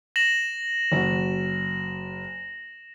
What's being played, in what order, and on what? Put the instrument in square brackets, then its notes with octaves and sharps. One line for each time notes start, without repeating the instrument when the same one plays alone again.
[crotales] A#6 E7 F#7
[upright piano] F#1 F#4